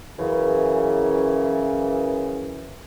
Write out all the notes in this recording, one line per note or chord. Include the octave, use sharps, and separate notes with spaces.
F#2 C#3 E3